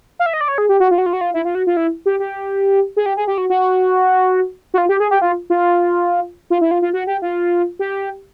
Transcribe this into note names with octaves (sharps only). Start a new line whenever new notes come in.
F5
E5
D#5
D5
C#5
G#4
G4
F#4
F4
F#4
F4
F#4
F4
E4
F4
F#4
F4
E4
G4
G4
G#4
G4
G#4
G4
F#4
F#4
F#4
F4
G4
G#4
G4
F4
F4
F4
E4
F4
F4
F#4
G4
F4
G4